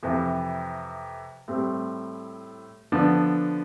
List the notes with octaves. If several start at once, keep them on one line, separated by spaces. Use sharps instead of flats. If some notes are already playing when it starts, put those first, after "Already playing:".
F2 C3 E3
A2 G3 C4
D3 F3 B3 D4